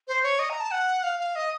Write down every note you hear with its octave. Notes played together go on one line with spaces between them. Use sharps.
C5
C#5
D#5
A#5
A5
F#5
F5
F5
D#5